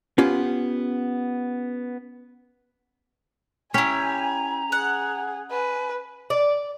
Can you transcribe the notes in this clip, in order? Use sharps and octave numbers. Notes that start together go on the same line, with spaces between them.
B3 C#4 F4 G4
C#4 E4 G4 G#5 A#5
G#4 F#5
B4 G#5
D5